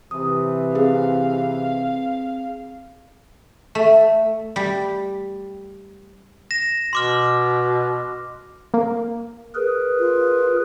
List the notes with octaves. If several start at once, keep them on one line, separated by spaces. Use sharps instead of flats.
C3 E3 D#6
C4 G#4 F5
A3
G3
A#6 E7
B2 C6 D6 F6
A#3
G#4 A#4 B4
F4